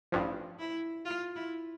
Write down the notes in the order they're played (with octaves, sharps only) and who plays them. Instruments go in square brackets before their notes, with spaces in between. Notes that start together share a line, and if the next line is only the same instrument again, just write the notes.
[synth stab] A1 G2 F3
[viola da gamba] E4
F4
E4